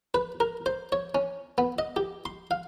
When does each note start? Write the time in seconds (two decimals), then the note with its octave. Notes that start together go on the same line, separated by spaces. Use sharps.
0.14 B4
0.40 A#4
0.66 C5
0.92 C#5
1.15 C#4
1.58 B3
1.79 D#5
1.96 G4
2.25 C6
2.51 F5